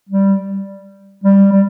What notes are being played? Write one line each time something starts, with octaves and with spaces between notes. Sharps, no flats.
G3
G3
G3